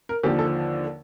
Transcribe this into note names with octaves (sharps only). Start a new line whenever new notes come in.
A#4
D#2 D3 F3 G4
A4